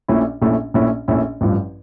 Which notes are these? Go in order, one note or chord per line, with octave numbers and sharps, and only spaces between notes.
A#1 A#2 A3 C#4 E4
A#1 A#2 A3 C#4 E4
A#1 A#2 A3 C#4 E4
A#1 A#2 A3 C#4 E4
A1 G2 F3